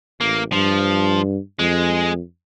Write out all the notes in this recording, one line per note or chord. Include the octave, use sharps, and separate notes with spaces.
A1 A#3
G2 F3
F2 G#3